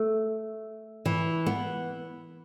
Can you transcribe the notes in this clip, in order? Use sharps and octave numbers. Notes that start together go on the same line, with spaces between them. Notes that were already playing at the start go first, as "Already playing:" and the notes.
Already playing: A3
E3
B3